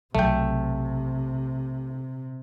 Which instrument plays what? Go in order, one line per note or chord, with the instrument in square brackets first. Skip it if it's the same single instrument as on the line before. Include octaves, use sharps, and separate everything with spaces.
[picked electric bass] B1 F#3 [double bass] C3 [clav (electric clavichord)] A3 G5